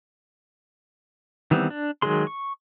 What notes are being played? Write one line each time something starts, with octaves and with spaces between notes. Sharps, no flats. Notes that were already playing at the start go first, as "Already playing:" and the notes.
D#3 E3 G3 B3 C4
D4
D#3 F#3 G#3 G#4 C6
C#6